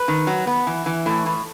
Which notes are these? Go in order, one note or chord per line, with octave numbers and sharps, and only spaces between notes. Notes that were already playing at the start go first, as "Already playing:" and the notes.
Already playing: B4
D#3
F#3
B3
E3
E3
A2
A2